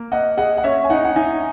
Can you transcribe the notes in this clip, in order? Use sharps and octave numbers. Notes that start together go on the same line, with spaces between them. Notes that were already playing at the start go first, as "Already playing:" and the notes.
Already playing: A#3
A#3 D#5 F#5
G#4 D#5 F#5
F#5
C#4 C#5 E5
G#5
D#4 D#5 F#5
F#5
D#4 E5 G#5